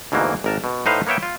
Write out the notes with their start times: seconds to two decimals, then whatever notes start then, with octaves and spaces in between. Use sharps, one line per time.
0.12 D2 G#2 B2 E3 A#3
0.44 G#1 A#4 A5
0.64 B2
0.86 A2 D#4 B4 C5 F5
1.06 A#3 B3 C#5 E5 G5
1.23 F4